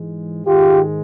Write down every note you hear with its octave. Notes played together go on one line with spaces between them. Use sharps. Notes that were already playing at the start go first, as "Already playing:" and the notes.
Already playing: G#2 E3 G#3
G#2 D#3 G#3 F4 G4